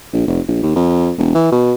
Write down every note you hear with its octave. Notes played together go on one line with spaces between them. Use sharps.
A#1
F1
A#1
D#2
F2
E1
E3
B2